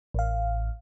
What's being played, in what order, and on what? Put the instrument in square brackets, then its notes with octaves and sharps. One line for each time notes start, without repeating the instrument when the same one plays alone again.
[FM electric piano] A1 F5